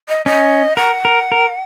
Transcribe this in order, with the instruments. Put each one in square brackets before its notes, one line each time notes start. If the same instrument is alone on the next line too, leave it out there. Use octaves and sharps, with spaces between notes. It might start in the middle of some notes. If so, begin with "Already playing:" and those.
[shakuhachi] D#5
[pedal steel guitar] C#4 [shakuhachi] D#5
[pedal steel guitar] A#4 [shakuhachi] F#5
[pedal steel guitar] A#4
A#4